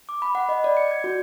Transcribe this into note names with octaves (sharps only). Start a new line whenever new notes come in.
D6
B5
F#5
D#5
D5
C#7
G#6
F#4